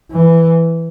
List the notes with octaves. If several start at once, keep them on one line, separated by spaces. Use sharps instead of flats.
E3